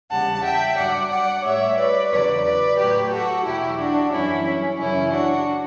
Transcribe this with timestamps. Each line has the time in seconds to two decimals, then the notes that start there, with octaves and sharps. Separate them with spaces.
0.11 E2 C#3 G3 F#5 A5
0.44 E5 G5
0.77 G2 F#3 D5 F#5
1.11 D5 F#5
1.44 A2 G3 C#5 E5
1.78 B4 D5
2.11 E2 C#3 F#3 B4 D5
2.44 B4 D5
2.78 A2 F#3 G4 B4
3.11 F#4 A4
3.45 E2 B2 F#3 E4 G4
3.78 D4 F#4
4.12 F#2 E3 G3 C#4 E4
4.45 C#4
4.79 F#2 C#3 E3 C#4 E4
5.12 D4 F#4